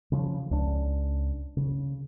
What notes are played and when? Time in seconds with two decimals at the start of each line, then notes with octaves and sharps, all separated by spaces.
0.12 C#3 F3
0.51 C#2 C#4 D4
1.57 C#3